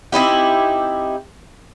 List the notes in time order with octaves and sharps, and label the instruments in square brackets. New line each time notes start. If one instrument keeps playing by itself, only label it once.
[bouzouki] C4 D#4 E4 G4